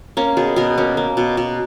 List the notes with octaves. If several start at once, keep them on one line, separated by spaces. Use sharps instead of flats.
A#3 C#4
B2 G#4
B2 A#4
A#3 C#4
A#3
B2
B2